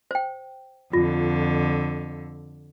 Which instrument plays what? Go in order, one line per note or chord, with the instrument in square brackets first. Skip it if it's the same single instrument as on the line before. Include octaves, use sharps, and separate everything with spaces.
[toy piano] C5 G5
[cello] F2 D3 [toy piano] F4